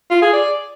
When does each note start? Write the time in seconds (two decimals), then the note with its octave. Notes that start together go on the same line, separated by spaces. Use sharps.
0.11 F4
0.22 G#4
0.33 D5